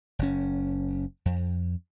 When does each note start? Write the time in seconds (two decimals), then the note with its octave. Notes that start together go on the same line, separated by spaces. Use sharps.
0.19 F#1 C#4
1.26 F2